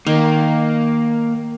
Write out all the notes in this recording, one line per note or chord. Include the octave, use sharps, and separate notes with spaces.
D#3 A#3